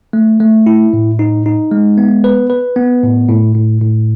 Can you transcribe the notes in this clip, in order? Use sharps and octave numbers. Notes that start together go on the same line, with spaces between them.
A3
A3
E4
A2
D#4
D#4
G#3
B3
B4
B4
B3
A2
A2
A2
A2